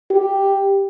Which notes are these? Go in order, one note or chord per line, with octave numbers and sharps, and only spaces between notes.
G4